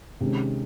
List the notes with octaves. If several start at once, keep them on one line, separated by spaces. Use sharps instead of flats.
C3 D#3 G#3 C#4